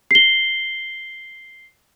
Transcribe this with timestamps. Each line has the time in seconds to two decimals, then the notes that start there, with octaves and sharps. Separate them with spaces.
0.11 C7 G7